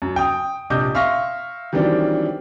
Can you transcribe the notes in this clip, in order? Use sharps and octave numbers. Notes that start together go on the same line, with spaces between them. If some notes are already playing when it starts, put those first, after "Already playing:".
F#2
G5 D#6
A#1 C3 D#5 D6 G6
E5 F5 C6 C#6 F6 A#6
D#3 E3 F#3 G3 C4 D4